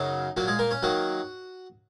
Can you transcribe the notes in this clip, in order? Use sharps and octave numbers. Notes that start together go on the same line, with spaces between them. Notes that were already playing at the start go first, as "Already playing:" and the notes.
Already playing: F#2 C#3 F#3 D#4
A#2 F#3 A#3 F#4
G#3 G#4
A#3 A#4
C#4 C#5
D#3 F#3 A#3 F#4 F#5